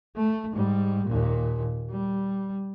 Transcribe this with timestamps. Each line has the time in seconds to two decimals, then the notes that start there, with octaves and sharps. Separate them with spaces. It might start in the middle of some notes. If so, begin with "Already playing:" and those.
0.16 A3
0.53 G#2 G3
1.06 D#2 A#2
1.91 G3